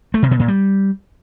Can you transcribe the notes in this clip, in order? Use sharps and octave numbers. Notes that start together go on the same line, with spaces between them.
A3
C3
B2
A#2
G3